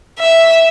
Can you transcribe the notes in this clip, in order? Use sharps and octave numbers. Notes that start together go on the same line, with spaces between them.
E5